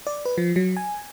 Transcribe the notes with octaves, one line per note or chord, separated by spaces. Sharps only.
D5
B4
F3
F#3
G#5